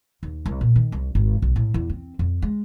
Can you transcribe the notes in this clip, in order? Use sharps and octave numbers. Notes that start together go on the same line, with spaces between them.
D#2
C2
A#2
D#3
C2
G#1
B1
A2
E2
C4
F2
G#3